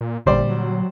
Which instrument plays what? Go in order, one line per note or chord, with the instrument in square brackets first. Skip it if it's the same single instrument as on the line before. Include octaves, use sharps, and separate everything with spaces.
[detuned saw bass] A#2
[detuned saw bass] A1 [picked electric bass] A#2 D3 [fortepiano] G3 C5 D5
[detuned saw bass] F#3